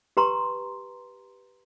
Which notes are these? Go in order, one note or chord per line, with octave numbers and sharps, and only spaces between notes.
G4 B4 A#5 C6